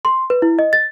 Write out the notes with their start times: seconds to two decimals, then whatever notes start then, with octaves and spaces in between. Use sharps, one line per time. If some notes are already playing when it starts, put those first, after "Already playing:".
0.05 C6
0.30 B4
0.42 E4
0.59 D#5
0.73 A6